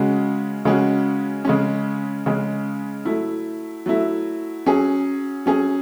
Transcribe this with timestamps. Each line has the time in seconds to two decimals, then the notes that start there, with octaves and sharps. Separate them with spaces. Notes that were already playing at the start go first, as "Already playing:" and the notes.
Already playing: C#3 G#3 C#4 F#4
0.65 C#3 G#3 C#4 F#4
1.45 C#3 G#3 C#4
2.26 C#3 G#3 C#4
3.05 F#3 A3 E4
3.86 F#3 A3 E4
4.66 F#3 C#4 G#4
5.46 F#3 C#4 G#4